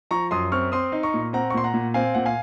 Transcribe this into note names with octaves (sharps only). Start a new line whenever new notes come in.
F3 A#5 C#6
F#2 C6 D#6
C4 C#6 F6
C4 C6 D#6
D#4
A#5 C#6
A#2
C4 F#5 A#5
C#6
A#2 C6
F#5 A#5
A#2
C4 F5 G#5
A#2 F#5
F5 G#5